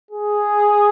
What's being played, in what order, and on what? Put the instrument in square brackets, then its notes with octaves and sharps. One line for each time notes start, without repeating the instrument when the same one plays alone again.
[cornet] G#4